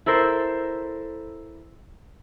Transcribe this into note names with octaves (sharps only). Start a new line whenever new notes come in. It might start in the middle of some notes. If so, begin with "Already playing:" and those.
E4 A4 A#4 C5